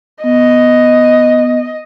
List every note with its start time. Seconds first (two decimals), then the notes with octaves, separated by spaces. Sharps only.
0.24 B3 D#5